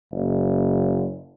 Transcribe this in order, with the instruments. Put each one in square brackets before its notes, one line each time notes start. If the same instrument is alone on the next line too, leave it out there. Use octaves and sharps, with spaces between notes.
[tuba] F#1